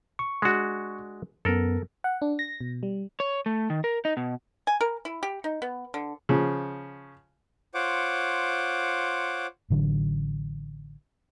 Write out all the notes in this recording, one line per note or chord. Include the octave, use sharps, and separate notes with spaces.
C#6
G#3 D4 F#4
F#2 B3 A4 A#4
F#5
D4
A#6
B2
G3
C#5
A3
D#3
A#4
D#4
B2
G#5
A#4
E4
G4
D#4
B3
D3
C#3 F3
F4 C5 C#5 F#5 D6
A1 D3 F#3